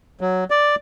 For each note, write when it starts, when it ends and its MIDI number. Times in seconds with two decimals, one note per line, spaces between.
0.21 0.44 54
0.50 0.75 74